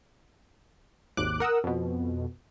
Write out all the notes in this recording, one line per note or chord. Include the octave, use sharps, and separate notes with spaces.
G#1 D#2 D6 F#6
A#4 F#5 D#6 E6
F2 B2